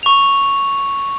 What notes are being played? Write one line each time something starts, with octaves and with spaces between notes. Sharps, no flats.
C#6 F7